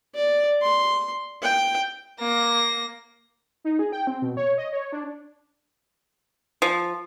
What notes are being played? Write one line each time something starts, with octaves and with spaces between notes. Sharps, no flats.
D5
C6
G5
A#3 A#6
D#4
G#4
G5
C4
B2
C#5
D#5
C#5
D4
F3